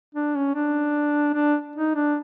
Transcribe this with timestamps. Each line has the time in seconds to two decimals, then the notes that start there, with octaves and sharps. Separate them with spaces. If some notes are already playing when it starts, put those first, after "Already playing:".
0.15 D4
0.35 C#4
0.55 D4
1.34 D4
1.76 D#4
1.95 D4